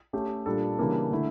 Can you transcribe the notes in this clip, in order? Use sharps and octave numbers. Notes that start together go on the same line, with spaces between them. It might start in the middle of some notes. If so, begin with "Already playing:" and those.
A3 C#4 G4
A#2 G3 D4 A4
C#3 E3 G3 A#3 D4
D3 A3 E4